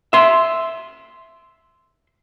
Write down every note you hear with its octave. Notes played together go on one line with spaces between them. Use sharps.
E5 C6